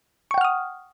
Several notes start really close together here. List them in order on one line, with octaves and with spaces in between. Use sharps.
C#6 G5 F#5 F6 D#6